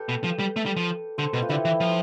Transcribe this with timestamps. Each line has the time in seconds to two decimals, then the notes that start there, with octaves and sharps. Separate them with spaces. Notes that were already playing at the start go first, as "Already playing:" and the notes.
Already playing: G4 A4 B4
0.09 B2
0.24 F3
0.40 G3
0.56 A3
0.66 G3
0.77 F3
1.18 D3 A4 C5
1.33 B2 G4 B4
1.42 F4
1.49 D3 E4 G4
1.65 E3
1.80 F3